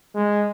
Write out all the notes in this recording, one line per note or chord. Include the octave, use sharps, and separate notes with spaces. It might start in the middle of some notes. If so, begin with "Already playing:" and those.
G#3